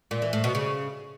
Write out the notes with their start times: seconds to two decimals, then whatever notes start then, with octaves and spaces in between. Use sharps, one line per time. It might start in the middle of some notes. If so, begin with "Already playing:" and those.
0.11 A#2
0.22 E3
0.33 A2
0.44 B2
0.55 C#3